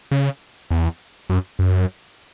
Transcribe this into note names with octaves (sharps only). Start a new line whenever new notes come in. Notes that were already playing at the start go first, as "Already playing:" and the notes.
C#3
E2
F#2
F#2